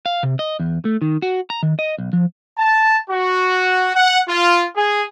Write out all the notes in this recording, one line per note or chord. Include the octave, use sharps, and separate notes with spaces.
F5
C3
D#5
E2
A3
D#3
F#4
A#5
D#3
D#5
B1
F3
A5
F#4
F#5
F4
G#4